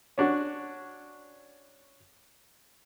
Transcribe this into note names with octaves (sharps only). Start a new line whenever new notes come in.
C#4 D4 F#4